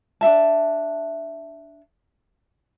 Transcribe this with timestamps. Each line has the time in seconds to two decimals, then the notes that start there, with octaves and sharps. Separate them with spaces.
0.21 D4 D#4 E5 A5